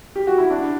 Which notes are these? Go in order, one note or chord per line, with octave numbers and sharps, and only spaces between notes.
G4
F#4
E4
D4